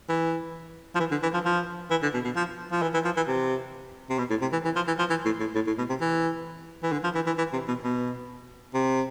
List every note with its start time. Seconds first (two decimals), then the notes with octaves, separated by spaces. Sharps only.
0.09 E3
0.95 F3
1.00 E3
1.11 D3
1.23 E3
1.34 F3
1.45 F3
1.91 E3
2.03 D3
2.14 B2
2.25 B2
2.36 F3
2.72 F3
2.82 E3
2.94 E3
3.05 F3
3.17 E3
3.28 C3
4.10 C3
4.18 B2
4.30 A2
4.42 C3
4.53 E3
4.65 E3
4.76 F3
4.87 E3
4.99 F3
5.10 E3
5.25 A2
5.40 A2
5.55 A2
5.67 A2
5.78 B2
5.89 C3
6.01 E3
6.83 E3
6.92 D3
7.04 F3
7.15 E3
7.27 E3
7.38 E3
7.53 C3
7.68 B2
7.84 B2
8.74 C3